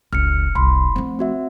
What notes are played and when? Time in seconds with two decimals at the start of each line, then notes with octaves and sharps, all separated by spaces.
0.13 F1 C#2 F6 C#7
0.55 C2 B5 C6
0.96 F3 A3 C4
1.19 C4 F#4 E5